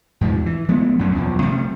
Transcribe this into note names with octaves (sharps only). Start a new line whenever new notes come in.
E2 G#2 C3 F3
E3
F3 G#3 A3 B3
A1 F#2 F#3 C#4
B1 E2 F3
C3 G3 A3